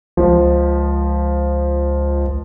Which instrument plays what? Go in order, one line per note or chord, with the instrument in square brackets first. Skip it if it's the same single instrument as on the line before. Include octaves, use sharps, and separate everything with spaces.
[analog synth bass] C#2 [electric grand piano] F3